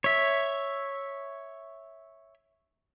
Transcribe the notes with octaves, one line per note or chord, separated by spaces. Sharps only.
C#5 E5